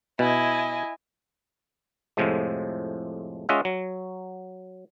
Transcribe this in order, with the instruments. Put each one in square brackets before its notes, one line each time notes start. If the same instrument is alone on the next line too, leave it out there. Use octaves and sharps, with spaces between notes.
[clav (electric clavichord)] B2 [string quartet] E4 D#5 [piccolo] G#5
[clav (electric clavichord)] F2 A2 C3 F3 G#3
G#3 C#4 F4 D#5 E5 F#5
F#3